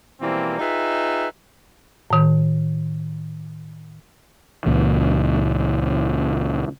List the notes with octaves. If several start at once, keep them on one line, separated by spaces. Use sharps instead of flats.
B2 E3 F3 G3 A#3 C4
D#4 F4 G#4 B4 E5 G5
A2 D#3
C#2 A#2 E3